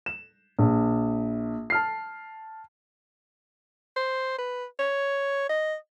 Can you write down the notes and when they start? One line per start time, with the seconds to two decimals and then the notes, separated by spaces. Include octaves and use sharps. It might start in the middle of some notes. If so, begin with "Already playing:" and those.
0.06 E7
0.59 A#1
1.70 A5 F6 C7
3.96 C5
4.38 B4
4.79 C#5
5.49 D#5